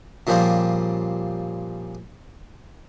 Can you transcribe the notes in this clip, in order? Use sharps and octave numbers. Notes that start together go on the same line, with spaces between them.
A#2 C#3 F3 G3 C4